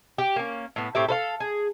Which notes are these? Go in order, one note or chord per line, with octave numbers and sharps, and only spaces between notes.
G4
A#3 C#4
A2 B3
A2 C4 G4 E5
A4 C5 F5
G#4